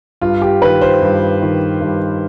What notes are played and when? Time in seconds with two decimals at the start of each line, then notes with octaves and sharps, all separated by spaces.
0.21 G2 F4
0.42 G4
0.62 D#3 B4
0.81 C5
1.02 G2
1.42 D#3
1.81 G2